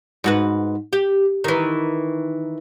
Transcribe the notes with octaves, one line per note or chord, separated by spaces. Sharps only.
G#2 F#4 B4
G4
D#3 E3